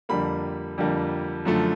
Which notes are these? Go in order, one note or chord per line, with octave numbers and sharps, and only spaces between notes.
F2 D3 G3 A#3 B5
F2 D3 G3 A#3
F#2 D3 F3 A3